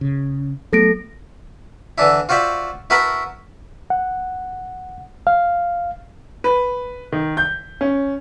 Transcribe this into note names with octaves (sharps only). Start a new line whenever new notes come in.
C#3
F#3 A3 B3 A4 A#6 D7
D3 E3 D4 E4
F4 F#4 C5 D5 E5
E4 F#4 A#4 B4 A5 B5
F#5
F5
B4
D#3
G6
C#4